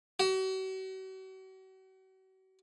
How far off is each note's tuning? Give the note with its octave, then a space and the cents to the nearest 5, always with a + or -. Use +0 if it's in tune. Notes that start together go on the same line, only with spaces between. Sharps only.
F#4 +40